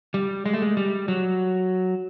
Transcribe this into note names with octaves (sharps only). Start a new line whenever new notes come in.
G3
G#3
A3
G#3
G3
F#3